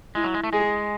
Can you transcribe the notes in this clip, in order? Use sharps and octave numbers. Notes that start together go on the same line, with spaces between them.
G#3 E4
F#3
G#3
A3
G#3 G#4